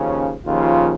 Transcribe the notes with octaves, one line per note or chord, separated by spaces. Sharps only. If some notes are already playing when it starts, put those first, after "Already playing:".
Already playing: D#2 C#3 F3 C#4
D#2 C#3 F3 F4